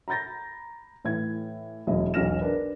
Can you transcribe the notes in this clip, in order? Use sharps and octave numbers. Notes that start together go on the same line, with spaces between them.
A#5 B5 G6 A6 A#6
A2 E3 G#6
E1 F#2 E4 D#5
E1 B1 C#4 F6 A#6 E7
D4 A#4 B4